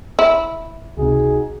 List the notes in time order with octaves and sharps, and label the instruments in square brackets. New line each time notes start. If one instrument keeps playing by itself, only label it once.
[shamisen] E4
[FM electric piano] C#2 C3 [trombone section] D#4 F#4 G#4